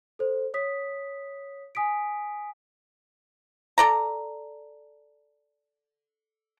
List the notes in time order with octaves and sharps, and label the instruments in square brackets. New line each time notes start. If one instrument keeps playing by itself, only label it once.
[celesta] A4 C5
C#5 D#6 B6
G#5 D#6 B6 D7
[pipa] A4 D5 A#5